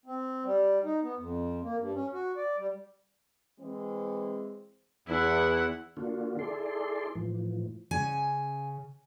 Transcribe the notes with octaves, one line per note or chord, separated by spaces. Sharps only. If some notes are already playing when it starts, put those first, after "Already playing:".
C4
G3
D#4
B3
F2
A#3
G2
C#4
F#4
D5
G3
E3 G#3 C4
E2 E4 F#5
D3 A#3 D4 F4 F#4
E4 G#4 A4 D5 C6
A2 E3 F3
C#3 G#5